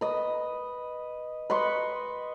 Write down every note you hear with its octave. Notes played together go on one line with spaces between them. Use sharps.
B4 D#5
B4 D#5 C6 C#6